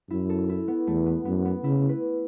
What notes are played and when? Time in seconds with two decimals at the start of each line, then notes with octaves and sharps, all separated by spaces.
0.10 F#2 E4
0.29 A4
0.49 E4
0.68 B3
0.87 E2 A3
1.06 B3
1.25 F#2 B3
1.45 B3
1.64 C#3 E4
1.89 B4